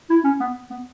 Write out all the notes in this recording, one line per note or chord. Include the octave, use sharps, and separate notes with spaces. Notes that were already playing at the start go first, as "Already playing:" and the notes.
E4
C#4
B3
B3